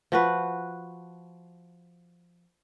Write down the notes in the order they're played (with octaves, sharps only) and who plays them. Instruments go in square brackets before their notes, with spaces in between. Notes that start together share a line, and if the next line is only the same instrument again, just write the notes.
[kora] F3 F#4 B4